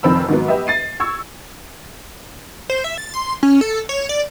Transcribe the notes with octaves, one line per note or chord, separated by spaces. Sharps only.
F1 F2 D#3 C4 B5 E6
G#2 D#3 F#3 B3
G4 B4 D#5 E5
A6 C7 D#7
C#6 E6 G#6
C5
E5
A6
C6
C#4
A4
C#5
D5